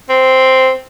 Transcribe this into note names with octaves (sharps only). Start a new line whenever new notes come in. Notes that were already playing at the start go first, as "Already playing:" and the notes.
C4